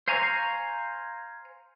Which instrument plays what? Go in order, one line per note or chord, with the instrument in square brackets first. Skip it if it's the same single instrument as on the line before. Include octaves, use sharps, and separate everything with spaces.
[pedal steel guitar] C5 F5 G#5 A#5 C#6